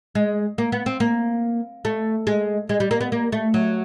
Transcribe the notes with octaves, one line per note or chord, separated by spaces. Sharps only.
G#3
A#3
B3
C4
A#3
A3
G#3
G#3
G3
A#3
B3
A#3
A3
F#3